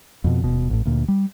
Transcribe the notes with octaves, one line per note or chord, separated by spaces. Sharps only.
F2 B2
D#1 B2
A1 A2
D2 A#2
G3